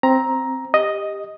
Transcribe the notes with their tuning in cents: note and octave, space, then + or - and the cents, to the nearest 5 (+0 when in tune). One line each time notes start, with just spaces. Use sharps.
C4 +0 A#5 +10
G4 +15 D#5 +0